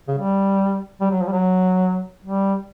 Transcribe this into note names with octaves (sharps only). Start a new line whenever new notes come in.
C#3
G3
G3
F#3
F3
G3
F#3
G3